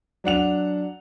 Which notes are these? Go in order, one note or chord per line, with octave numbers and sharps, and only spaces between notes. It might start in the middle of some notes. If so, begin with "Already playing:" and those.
F#3 D4 F#5 F7